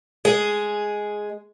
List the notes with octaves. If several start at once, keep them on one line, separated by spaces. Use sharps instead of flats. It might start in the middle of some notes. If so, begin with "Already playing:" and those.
G#3 G#4